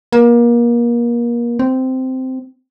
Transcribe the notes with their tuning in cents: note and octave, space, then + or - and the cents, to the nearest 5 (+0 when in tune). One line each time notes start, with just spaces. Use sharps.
A#3 +30
C4 -10